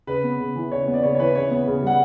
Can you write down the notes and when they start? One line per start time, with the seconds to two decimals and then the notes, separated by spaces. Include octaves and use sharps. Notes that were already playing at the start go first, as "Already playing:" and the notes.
0.07 C#3 B4
0.24 B3
0.40 C#3
0.56 E3
0.71 C#3 C#5
0.88 B3
0.94 D5
1.03 C#3 C#5
1.15 C#5
1.19 E3 B4
1.35 C#3 C#5
1.51 B3
1.67 C#3
1.82 G3 F#5